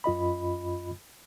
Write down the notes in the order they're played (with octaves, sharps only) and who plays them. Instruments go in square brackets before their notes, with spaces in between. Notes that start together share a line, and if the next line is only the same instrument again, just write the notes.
[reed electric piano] F#2 F4 D#5 B5